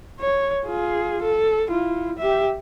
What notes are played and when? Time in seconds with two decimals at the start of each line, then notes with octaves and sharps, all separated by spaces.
0.20 C#5
0.65 F4 G#4
1.22 A4
1.68 E4 F4
2.18 G4 E5